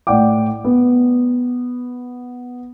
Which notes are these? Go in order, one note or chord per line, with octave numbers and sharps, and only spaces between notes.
A2 D5 F#5 G5 D6
B3